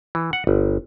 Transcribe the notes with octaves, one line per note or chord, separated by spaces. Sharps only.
E3
F#5
G1